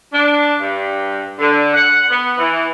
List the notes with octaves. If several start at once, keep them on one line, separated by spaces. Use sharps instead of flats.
D4
G2
D3
F#5
B3
E3